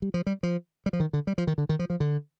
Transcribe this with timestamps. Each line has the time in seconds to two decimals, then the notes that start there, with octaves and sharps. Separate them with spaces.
0.02 G3
0.14 F3
0.26 G3
0.43 F3
0.86 G3
0.93 F3
1.00 D#3
1.13 D3
1.27 G3
1.38 F3
1.47 D#3
1.58 D3
1.69 D#3
1.79 F3
1.90 F3
2.00 D3